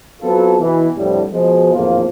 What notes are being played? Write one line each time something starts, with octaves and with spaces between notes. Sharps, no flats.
F#3 B3 C4 F4 A4
B2 E3
C2 F2 A2 D3 G3
B2 F3 G#3
G#1 E2 A2 F3 A#3 F4